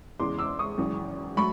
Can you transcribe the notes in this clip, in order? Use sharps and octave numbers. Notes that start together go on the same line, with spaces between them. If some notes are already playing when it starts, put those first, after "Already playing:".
E2 C#3 E3 G#3 C6 D6
D6 E6
C#6 D#6
G#1 F#2 C#3 E3
F#3 A3 B5 C#6